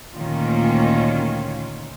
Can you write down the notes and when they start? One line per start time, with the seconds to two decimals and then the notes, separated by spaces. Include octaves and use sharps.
0.15 D2 A#2 D#3 A#3 C#4 F4